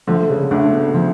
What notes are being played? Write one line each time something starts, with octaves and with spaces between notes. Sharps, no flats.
D2 D3 F3
C#3
D2 D3 A3 D4
B2
D3 F3